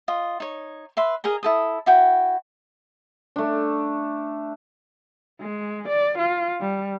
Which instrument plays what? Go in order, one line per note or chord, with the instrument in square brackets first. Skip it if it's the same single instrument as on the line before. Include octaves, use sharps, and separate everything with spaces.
[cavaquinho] F4 D#5
D#4 C#5
B4 E5 C6
G#4 A#4 D#5 A#5
E4 A4 D#6
E4 F#4 G5
[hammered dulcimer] A3 D4
[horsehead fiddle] G#3
D5
F4
G3